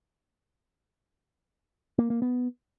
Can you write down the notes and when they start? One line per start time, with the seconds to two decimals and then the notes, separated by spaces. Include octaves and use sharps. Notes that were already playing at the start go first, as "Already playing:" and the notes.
1.98 A#3
2.10 A#3
2.22 B3